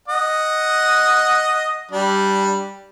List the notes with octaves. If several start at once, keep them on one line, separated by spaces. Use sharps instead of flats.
D#5 F#5
G3 D4